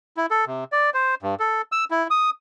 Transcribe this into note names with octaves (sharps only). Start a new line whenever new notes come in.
E4
A4
C3
D5
C5
G2
A4
E6
E4
D#6